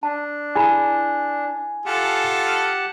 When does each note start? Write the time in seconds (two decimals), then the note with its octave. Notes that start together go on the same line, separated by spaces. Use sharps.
0.03 D4 A5
0.56 E4 G#4 G#5 B5
1.86 F4 G4 A4 F#5 A5